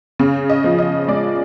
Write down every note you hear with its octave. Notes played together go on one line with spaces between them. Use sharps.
C#3
D#5
F3
D#5
G#3 D5